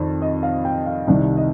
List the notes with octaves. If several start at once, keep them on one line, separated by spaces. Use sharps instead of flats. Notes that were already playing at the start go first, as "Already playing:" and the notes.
Already playing: F2 D#3 D5
D#5
F5
G5
F5
C2 C3 D#3 D5
D#5